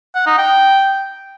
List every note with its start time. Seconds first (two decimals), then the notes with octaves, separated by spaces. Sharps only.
0.15 F#5
0.26 D#4
0.38 G5